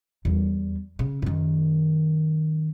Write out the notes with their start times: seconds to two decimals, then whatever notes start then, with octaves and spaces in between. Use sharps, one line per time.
0.25 E2 G3
0.99 C#3
1.22 F#2 D#3